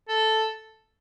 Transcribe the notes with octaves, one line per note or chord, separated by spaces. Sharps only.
A4